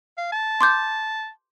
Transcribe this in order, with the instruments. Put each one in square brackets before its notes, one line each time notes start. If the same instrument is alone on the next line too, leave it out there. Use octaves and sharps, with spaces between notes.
[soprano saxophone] F5
A5
[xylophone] C6 D6 G6